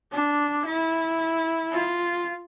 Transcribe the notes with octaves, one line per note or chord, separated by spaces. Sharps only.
D4
E4
F4